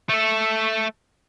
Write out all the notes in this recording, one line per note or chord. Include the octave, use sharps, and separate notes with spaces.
A3 A4